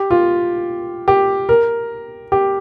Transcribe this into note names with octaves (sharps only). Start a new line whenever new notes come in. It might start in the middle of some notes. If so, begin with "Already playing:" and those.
Already playing: G4
F4
G4
A#4
G4